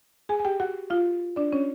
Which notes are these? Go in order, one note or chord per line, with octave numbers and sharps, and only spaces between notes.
G#4 G#5
G#5
G4 G5
F#4 F#5
F4 F5
D4 D5
C#4 C#5